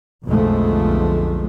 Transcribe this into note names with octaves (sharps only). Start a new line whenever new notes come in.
B1 F2 D3 F3 G#3 A3